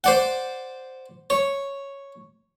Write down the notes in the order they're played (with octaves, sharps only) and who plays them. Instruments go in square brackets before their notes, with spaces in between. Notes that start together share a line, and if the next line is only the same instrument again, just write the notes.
[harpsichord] C5 D5 F#5
C#5